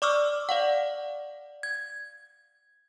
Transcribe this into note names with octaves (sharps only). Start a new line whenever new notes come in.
D5 C#6 D6 E6 F6
D5 F5 F#5
G#6